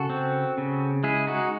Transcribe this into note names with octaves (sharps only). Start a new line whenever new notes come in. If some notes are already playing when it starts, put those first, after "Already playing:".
Already playing: C#3 F#4 A4
C4
C#3
G#3 E4 G#4
D#4 F#4